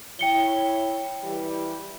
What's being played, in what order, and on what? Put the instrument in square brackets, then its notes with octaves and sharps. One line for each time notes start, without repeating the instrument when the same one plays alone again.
[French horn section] E4 C#5 [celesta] G5 C#7 G7
[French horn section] E3 G3